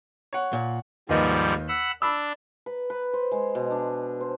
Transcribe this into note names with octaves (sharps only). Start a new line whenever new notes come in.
C#5 F#5
A#2
D#2 G#2 F3 G3 B4 D#5
F#5 B5 E6
D4 B5 E6
B4
B4
C5
G#3
B2
D4
C5